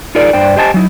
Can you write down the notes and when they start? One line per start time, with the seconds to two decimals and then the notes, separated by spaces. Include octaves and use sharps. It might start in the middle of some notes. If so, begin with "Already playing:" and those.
0.15 D#4 F4 G#4 A#4 D5
0.33 G2 D4 C5 D5 G5
0.56 G4 C5 D#5 G#5 A5
0.74 F#3 D#4 E4